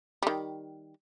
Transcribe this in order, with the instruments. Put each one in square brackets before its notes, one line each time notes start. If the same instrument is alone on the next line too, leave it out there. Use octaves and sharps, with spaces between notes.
[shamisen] D#3 G3